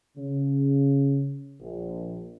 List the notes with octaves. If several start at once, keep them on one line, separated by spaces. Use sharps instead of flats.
C#3
A#1